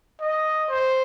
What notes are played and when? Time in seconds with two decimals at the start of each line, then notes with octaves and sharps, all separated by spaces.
0.21 D#5
0.69 C5